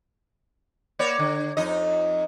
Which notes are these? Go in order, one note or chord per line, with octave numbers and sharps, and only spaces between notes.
A#3 C#5 D5
D3
F2 D#4 D#5